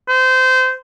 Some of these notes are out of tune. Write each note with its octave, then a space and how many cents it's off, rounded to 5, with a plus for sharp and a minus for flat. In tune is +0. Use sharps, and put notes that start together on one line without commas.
C5 -25